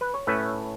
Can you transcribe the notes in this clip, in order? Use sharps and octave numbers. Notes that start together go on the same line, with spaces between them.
B4
C#5
A2 A3 C#4 B4 E5